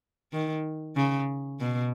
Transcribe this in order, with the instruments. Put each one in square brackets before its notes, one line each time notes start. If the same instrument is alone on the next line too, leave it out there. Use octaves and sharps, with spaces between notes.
[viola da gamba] D#3
C#3
B2